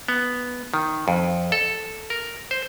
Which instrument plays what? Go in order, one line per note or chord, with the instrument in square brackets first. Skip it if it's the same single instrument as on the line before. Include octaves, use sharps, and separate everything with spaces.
[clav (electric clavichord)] B3
D#3
F2
A4
A#4
C5